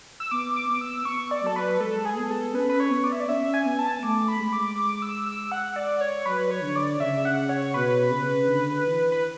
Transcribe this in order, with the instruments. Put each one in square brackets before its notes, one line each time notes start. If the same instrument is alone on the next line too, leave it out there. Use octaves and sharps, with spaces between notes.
[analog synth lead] E6
[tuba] B3 [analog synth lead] D6
[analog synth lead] D6
[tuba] B3
[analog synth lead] E6
[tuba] B3 [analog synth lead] C#6
[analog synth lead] D5
[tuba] F#3 [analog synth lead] A4
[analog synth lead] B4
[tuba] G#3 [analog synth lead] A4
[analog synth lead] G#4
[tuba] B3
[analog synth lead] A4
[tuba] C#4 [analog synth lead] B4
[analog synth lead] B4
C#5
[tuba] B3
[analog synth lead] D5
E5
D5
[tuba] C#4 [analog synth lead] E5
[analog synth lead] G#5
[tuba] B3
[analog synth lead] A5
[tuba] A3 [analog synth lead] D6
[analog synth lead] B5
[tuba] G#3
[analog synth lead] D6
D6
E6
E6
F#5
D5
C#5
[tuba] F#3 [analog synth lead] B4
[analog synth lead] C#5
[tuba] D3
[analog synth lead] D5
[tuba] C#3 [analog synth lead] E5
[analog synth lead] F#5
C#5
[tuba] B2 [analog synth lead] B4
[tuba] C#3
D3
E3
[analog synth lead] B4